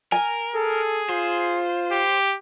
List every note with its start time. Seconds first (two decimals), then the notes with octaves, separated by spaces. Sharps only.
0.12 A#4 G#5
0.55 G#4 A4
1.09 F4 C5
1.91 G4